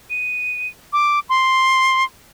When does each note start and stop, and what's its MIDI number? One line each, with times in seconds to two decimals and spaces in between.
0.10 0.68 99
0.93 1.19 86
1.29 2.03 84